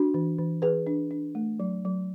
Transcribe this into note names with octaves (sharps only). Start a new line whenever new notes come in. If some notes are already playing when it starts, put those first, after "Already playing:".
Already playing: D4 F#4
E3
E3
E3 G#4 B4
D4
D4
A3
F#3
F#3